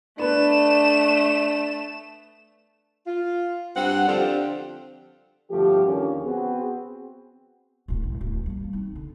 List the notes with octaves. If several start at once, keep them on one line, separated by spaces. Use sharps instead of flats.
A3 B3 D4 B4 E7
F4
G2 C4 F#5
D3 F3 C4 D4 G4
G1 F2 F3 A3 F#4 G4
D#2 D3 F3 A#3 C#4
B3 C4 F#4 G#4
D1 A#1
E1
D1
G3 A#3
C4 D#4
D3